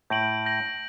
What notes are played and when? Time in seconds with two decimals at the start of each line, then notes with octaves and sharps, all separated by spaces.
0.10 A2 G6 A#6 D7 F#7
0.45 G6 A#6 D7 F#7